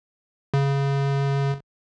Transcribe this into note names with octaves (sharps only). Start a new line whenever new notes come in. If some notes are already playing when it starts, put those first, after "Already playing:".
C#3